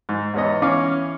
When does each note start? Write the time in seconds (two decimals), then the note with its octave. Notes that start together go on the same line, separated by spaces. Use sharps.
0.09 G#2
0.34 E2 G#2 B3 C#5 D#5
0.62 E3 C#4 C#5 F5 D6